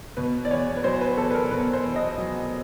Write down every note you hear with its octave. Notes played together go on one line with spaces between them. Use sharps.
B2 B4
D5
E2 C#5
B4
F#3 C5
B4
E2 A4
B4
A#4
B2 B4
C5
E2
D#5
F#3